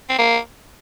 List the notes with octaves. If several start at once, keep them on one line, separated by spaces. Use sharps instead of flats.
C4
A#3